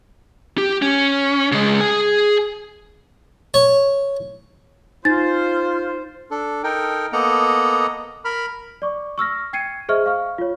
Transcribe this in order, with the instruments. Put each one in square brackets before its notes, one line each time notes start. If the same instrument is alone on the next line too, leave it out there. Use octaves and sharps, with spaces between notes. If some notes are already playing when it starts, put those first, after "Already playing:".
[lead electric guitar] G4
C#4
C#3 G#3
G#4 G#5
[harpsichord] C#5
[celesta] D#4 A6 [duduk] F4 [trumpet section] C5
[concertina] D4 A4
D#4 A4 A#4 G5
A#3 B3 A4 D#5 F#5 A#5
A#4 B5 F6
[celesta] D5 C#6 D6
C#6 E6 F6 A#6
G5 G#6 C7 C#7 D#7
G#4 C5 D#5 E5 C#6 F6
F5 C#6 F6
F4 C#5